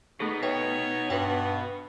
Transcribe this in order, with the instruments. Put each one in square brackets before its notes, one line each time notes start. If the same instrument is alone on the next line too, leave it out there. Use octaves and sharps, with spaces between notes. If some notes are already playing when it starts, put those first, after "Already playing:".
[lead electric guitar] B2 B3 [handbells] A3 G#4 A4 [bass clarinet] D#4
[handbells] B4 E5 G5 [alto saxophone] C#5
[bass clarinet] G2 [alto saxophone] F#4 [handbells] B4 G5